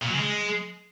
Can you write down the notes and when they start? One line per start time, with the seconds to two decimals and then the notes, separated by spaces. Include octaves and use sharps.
0.03 A#2
0.08 F#3
0.14 C#3
0.20 G#3